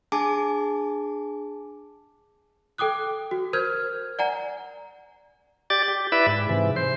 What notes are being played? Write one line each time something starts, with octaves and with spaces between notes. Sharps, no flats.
D4 G#4 G#5 A5 D6
A4 G5 D6 D#6 F#6
F#4
A#4 C5 F6 G6 G#6
D5 F#5 G#5 A#5
G4 D5 A6
G4
E4 B4 D5 E5
G#2
G#2 C3 E3
C5